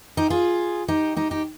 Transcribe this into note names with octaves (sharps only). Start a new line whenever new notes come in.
D#4 G4
F4 G#4
D#4 G4
D#4 G4
D#4 G4